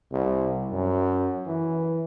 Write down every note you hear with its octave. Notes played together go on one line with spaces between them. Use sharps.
C2
F#2
E3